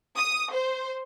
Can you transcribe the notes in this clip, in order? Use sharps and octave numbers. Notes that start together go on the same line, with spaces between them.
D#6
C5